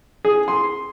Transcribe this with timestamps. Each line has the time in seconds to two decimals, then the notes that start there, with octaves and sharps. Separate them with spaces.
0.25 G#4
0.48 C6